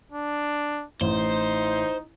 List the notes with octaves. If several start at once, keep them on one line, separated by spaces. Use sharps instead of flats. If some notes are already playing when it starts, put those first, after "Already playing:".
D4
A1 D#4 C5